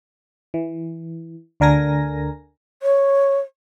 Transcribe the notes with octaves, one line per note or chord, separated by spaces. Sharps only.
E3
D2 D3 A#4 G#5 A#6
C#5